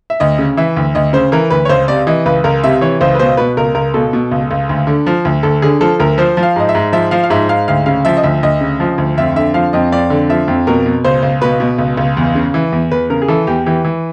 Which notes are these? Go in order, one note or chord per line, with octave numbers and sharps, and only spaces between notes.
E5
D2 D#5
C#3
E3 E5
D2
D2 D#5
C#3 C5
E3 A#4
D2 B4
C#5
C#2 C5
C3 D5
E3 D#5
C#2 B4
C#2 A#4
C3 E5
E3 C#5
C#2 C5
B4
B2 C5
B2 B4
C#2 A#4
C#2 A#4
B2 A4
B2
C#2
C#2
D2
D3
F3
D2
D2 A4
D3 G#4
F3 A4
D2 A#4
F3 C5
F3
F5
G#2 D#5
E5
G#2
F3 E5
F3 F5
F5
G#2 E5
G#2 F5
D2 F5
C#3 F5
F3 E5
D#5
D2 E5
D2 D#5
C#3
F3
D2
F2 E5
D3 E5
F3 F5
F2 D#5
F2 D5
D3
F3 E5
F2
B2 A#4
B2
C#2 C5
C#2
B2 B4
B2
C#2
C#2
E2
C#3
E3
E2
E2 B4
C#3 A#4
G#4
E3 A4
E2 G4
E3 G4
E3